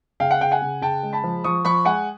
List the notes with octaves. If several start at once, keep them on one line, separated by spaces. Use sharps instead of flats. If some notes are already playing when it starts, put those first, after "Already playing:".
C#3 F5 G5
F#5
C#3 G5
F#5 G#5
C#3
C#3 G5 A5
G#3
A5 B5
F3
F3 C#6 D#6
F3 B5 C#6
G#3 F#5 G#5